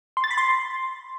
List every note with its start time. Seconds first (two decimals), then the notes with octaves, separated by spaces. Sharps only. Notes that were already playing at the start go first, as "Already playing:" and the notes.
0.17 C6
0.24 A6
0.31 B5
0.37 C6